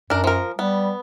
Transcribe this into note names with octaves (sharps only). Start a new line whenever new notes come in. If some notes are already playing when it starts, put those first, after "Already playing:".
F#2 D4 A#4
F3 A#4
G3 B3